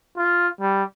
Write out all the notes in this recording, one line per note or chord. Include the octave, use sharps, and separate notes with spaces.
F4
G3